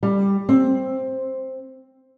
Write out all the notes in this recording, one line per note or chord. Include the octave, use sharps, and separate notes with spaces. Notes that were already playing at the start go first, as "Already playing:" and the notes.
G3
C4